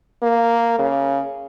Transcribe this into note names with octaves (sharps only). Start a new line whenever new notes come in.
A#3
C#3